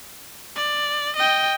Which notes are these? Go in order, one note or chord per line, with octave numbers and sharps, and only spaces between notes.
D5
D#5 G5